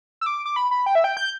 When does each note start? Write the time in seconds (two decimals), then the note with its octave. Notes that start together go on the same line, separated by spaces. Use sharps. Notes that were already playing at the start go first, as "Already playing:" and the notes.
0.21 E6
0.26 D6
0.46 D6
0.56 B5
0.71 B5
0.86 G5
0.95 E5
1.04 G5
1.17 G6